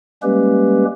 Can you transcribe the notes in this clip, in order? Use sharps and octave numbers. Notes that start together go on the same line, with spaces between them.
G3 G#3 A#3 C#4 G4 B4